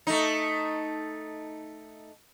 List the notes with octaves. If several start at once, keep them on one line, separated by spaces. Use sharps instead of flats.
A3 D#4